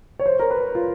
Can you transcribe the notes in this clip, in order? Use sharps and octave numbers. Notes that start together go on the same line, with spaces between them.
C#5
C5
A#4
B4
F4